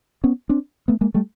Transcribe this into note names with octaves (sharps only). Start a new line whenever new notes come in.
B3 C#4
C4 D4
A3 B3
G#3 A#3
G3 A3